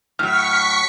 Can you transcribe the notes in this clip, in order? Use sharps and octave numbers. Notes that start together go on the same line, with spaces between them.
A2 F#3 C#6 F6 B6 C#7